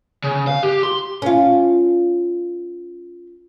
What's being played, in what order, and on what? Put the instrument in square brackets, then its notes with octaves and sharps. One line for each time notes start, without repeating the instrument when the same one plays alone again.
[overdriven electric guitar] C#3
F5
G4
C6
[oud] C#4 F4